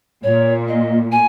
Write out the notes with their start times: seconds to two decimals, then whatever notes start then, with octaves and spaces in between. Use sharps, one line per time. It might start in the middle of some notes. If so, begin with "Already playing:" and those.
0.23 A#2 C#5
0.68 D#5
1.12 G#5